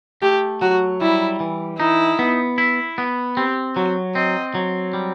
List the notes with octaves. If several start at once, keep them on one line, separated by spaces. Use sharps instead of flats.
A3 G4
F#3 F#4
G3 E4
E3
D#4 E4
B3
E4
B3
C4 G4
F#3 F#4
C4 D#5
F#3
G3